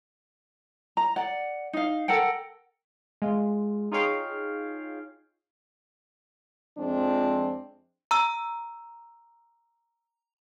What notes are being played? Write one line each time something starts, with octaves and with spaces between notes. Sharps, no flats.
A#5
D5 F#5
D#4 F5
A4 A#4 F#5 G5
G#3 F4
D#4 F4 G#4 C#5 F5 G5
F2 F3 G#3 C4 D4
A#5 E6